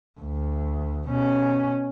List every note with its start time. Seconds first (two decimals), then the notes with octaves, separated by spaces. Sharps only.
0.20 D2
1.08 B2 C#4